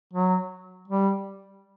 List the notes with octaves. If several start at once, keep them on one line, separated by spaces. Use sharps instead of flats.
F#3
G3